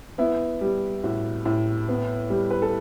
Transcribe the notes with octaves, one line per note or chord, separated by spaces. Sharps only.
B3 E4
G3
A2 F#4
A2
B3
G3
B4
A4